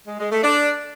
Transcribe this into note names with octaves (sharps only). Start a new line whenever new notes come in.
G#3
G#3
A3
D4